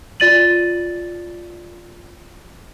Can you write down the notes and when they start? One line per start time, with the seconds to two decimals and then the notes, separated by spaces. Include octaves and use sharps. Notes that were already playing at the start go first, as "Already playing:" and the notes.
0.20 F4 D5 A6 D#7 F#7